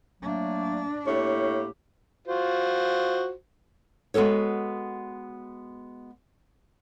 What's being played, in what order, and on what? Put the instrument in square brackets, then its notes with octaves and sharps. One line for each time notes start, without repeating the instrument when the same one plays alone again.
[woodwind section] F#3 A3 A#3 [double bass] D4
[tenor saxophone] A2 [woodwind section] A#3 G4 [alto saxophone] C#5
[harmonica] F4 F#4 C5
[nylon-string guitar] G#3 B3 F#4 A4 C#5